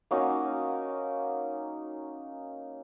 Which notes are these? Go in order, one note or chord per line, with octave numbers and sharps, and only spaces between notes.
A#3 C#4 D#4 F#4